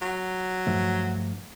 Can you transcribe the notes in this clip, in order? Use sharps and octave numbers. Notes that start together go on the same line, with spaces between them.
F#3
G2 F3 A3